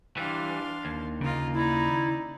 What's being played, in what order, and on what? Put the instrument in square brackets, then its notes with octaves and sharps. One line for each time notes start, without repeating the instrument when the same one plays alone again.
[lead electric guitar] E3 G3 [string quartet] D4 F5 C6
[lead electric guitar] D#2
[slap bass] C#3 [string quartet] A#3 F4 D#5
[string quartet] D#4 D5 [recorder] E4